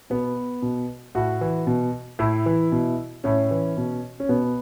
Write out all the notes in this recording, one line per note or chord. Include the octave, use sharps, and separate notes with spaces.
B2 B3
B2
A2 F#4
E3
B2
A2 E4
E3
B2
A2 C#4
E3
B2
C#4
B2 B3